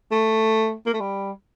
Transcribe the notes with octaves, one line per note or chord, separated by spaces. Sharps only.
A3
A#3
A3
G3